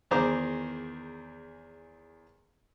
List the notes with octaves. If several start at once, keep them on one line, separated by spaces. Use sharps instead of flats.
E2 D#3 G#4 C5 A#5 D6